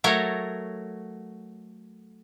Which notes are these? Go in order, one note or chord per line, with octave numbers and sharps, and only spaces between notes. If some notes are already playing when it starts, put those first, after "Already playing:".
F#3 A3 A#4 C#5